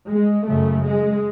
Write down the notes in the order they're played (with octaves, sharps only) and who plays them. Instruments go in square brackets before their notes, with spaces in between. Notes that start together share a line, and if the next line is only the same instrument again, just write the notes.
[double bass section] G#3
F#2 C#3 A3
G#3